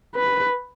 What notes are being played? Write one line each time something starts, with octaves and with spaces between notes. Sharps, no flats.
B4